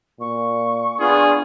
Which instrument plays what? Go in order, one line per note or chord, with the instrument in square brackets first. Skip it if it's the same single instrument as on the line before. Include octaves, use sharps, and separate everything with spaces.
[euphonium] A#2 [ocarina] C#6
[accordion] B3 F4 [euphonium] D4 [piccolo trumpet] G#4